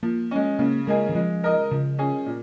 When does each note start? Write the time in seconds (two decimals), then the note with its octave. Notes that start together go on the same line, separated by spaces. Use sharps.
0.03 F3 A#3
0.31 G#3 C#4
0.59 C#3 A#3
0.87 G#3 A#3 D#4 G#4
1.09 D#3
1.15 F3 G#3
1.43 D#4 A#4 D#5
1.71 C#3 F3
1.99 C#4 G#4
2.26 A#2